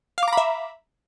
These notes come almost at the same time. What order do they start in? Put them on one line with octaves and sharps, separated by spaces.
F5 D6 A#5 B5 E5